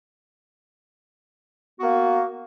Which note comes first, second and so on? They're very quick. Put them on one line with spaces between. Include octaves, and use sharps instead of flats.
F#4 B3 A#3